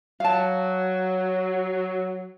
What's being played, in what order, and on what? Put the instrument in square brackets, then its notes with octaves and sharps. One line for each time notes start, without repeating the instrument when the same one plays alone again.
[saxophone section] F#3 [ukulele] F5 A5